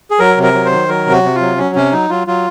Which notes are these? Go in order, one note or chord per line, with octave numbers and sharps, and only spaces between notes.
G#4
F#3 A#4
C3
A#4
F#3
C5
D#3
F#3 A#4
C3
F#4
C3
F4
F#3
F#3 C#4
C3 C#4
F#3 D#4
F#3 F4
F#3 F4